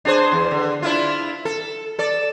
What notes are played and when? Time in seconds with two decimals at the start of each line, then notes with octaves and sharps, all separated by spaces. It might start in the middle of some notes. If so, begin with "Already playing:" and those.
0.05 D4 G#4 C5
0.32 E2
0.51 D3
0.82 D4 E4 F4
1.45 A4
1.99 A4 D5